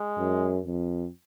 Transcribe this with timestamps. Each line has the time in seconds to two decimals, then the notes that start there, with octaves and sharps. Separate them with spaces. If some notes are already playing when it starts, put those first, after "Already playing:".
Already playing: G#3
0.18 F#2
0.65 F2